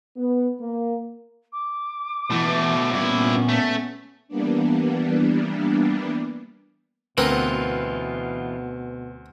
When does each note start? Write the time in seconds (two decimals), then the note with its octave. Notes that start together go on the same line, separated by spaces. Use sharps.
0.16 B3
0.60 A#3
1.52 D6
2.30 B2 E3 A3
2.92 G2 A#2 B3 C#4 E4
3.49 A3 B6
4.28 E3 G3 A#3 B3 D4
7.18 D2 B2 E3 B3 C4 F4 A#4 B4